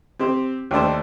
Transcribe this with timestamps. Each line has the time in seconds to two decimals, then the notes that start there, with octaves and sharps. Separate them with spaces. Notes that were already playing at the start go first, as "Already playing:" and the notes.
0.19 C4 G4 C5
0.71 D#2 A3 D4 C5